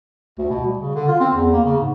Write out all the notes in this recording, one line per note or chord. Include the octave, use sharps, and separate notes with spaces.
D2
B2
G3
C#3
D3
F4
C4
E2
A#3
C#3
G#2